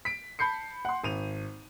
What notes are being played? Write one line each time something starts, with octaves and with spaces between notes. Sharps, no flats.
B6 D7
A5 B5 G6 C7 C#7
F#5 C6
G#1 D#7 F7